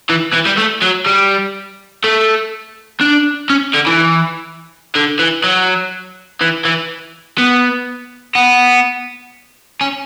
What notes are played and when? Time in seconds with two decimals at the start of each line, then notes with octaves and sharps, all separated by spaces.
0.10 E3
0.34 E3
0.47 G3
0.58 A3
0.83 F#3
1.07 G3
2.04 A3
3.01 D4
3.50 C#4
3.74 D3
3.86 E3
4.96 D3
5.19 E3
5.44 F#3
6.41 E3
6.65 E3
7.38 B3
8.35 B3
9.81 C#4